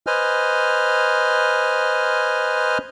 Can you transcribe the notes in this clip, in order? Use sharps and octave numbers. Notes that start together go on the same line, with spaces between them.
B4 C5 D#5 G#5 F6